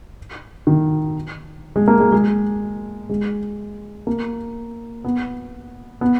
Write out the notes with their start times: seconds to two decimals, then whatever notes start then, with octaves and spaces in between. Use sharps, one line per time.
0.67 D#3
1.76 G#3
1.88 A#3
2.00 G#3
2.12 G#3
3.10 G#3
4.07 A#3
5.05 B3
6.01 B3